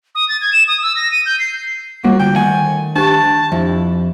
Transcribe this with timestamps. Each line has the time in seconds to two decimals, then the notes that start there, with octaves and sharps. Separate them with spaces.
0.15 D#6
0.29 A6
0.41 G#6
0.53 E7
0.68 D#6
0.83 E6
0.96 A#6
1.12 D#7
1.26 G6
1.39 C7
2.04 G3 A#3 F#4
2.19 D2 G5
2.36 D#3 A3 F#5 G#5
2.96 D4 G4 A5
3.52 F2 E4